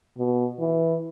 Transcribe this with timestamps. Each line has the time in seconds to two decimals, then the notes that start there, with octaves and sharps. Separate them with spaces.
0.18 B2
0.60 E3